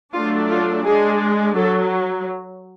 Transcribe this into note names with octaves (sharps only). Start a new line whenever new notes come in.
F#3 A3 D4 F4
F4
G#3 D4 G#4
F#3 A4